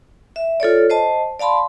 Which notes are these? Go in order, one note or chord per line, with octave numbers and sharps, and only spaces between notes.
E5
F4 A4 C#5 D5
C5 D#5 A5
D5 F5 A5 B5 C6